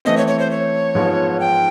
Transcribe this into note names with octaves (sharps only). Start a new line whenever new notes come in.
E3 A3 C4 D#5
C#5
C#5
C5
C#5
G#2 F3 G#3 B3
G5